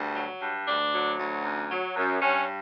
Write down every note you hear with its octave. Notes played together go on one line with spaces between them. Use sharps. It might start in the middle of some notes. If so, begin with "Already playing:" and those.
Already playing: D2 G2
F#3
G2
D2 D4
F#3
D2
F#2
F#3
F#2
G2 C#4